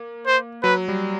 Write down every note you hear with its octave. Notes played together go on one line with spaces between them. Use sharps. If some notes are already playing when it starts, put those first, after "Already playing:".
Already playing: A#3
C5
F#3 B4
G3